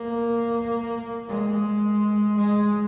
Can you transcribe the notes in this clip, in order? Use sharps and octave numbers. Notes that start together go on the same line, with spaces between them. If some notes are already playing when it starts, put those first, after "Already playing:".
Already playing: A#3
G#3
G#3